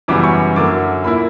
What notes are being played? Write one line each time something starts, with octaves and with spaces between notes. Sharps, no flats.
F#2 C#3 E3 G3 B3 D6
C#6
F#2 D3 A#3 D6
A#2 A#3 E4 B5